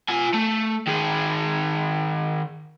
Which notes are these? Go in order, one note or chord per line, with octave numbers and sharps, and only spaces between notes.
F4 G#5
A3
D#3 G#4